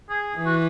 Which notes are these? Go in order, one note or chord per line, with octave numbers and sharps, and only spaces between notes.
G#4
E3
F#4